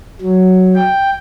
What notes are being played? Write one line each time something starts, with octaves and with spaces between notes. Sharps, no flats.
F#3
G5